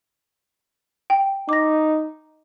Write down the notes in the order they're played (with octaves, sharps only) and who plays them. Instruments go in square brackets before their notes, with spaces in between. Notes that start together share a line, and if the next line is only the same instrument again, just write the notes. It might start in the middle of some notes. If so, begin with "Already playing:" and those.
[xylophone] G5
[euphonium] D#4 [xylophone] D6 A#6